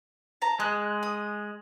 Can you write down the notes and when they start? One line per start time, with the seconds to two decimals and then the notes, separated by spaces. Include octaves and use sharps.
0.42 A5 A#5
0.60 G#3 F#6
1.03 D#6